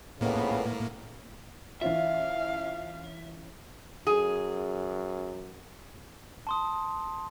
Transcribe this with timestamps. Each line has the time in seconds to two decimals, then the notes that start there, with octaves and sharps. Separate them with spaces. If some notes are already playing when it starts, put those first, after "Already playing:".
0.21 F2 A2 C#3 A#3 B3
1.81 E3 C#4 F4 E5 F5
4.07 F#2 G#4
6.47 A5 C6 D#6